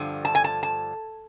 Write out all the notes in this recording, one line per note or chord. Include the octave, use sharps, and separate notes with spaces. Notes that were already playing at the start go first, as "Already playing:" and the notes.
Already playing: G2 D3 F3
A5
G#5
A5
A5